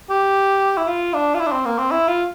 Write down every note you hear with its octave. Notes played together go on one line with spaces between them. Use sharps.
G4
E4
F4
D4
F4
E4
D4
C4
A#3
C4
E4
F4